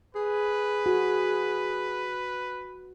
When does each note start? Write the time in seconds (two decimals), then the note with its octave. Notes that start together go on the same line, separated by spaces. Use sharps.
0.15 G#4 B4
0.86 F#4